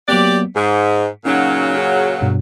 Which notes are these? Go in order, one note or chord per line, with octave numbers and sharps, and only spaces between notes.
F#3 A#3 B3 G4 D5
G#2 G#4
A#2 C#3 F#3 C#4 D#4
G#4
G2 B2